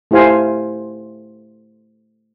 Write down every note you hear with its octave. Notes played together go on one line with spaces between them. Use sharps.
A3 E4 G4 C5 F5 G#5